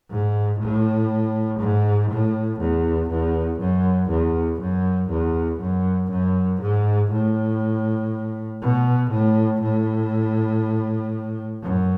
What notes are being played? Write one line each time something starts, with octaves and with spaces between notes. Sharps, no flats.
G#2
A2
G#2
A2
E2
E2
F#2
E2
F#2
E2
F#2
F#2
G#2
A2
B2
A2
A2
F#2